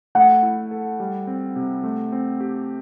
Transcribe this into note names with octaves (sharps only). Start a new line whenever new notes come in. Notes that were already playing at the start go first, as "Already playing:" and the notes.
A3 F#5
E4
A4
G3
C4
C3
A3
C4
G4